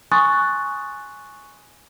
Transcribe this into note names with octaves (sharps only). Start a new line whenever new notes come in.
G#5 C6 C#6 D#6 F#6 A6